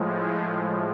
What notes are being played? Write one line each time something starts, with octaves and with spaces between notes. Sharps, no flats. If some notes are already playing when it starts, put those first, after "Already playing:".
Already playing: A2 F3 G#3